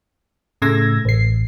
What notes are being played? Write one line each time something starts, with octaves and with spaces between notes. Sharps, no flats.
A2 C#3 A3 E6 G#6 A#6
A1 C7